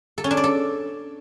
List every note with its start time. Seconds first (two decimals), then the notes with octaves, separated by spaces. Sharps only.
0.18 A4
0.24 C#4
0.31 D4
0.37 D5
0.44 A4